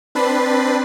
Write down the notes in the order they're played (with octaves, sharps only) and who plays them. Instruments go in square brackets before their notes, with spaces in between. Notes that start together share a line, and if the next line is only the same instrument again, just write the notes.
[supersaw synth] C4 D4 B4 B5 A6 C7